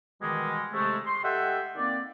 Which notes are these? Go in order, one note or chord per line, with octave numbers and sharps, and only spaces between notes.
B2 D#3 E3 G3 G#3
C3 G#3 A3
C6
G4 A4 D#5 E5 F#5 G5
D#3 A#3 C4 D5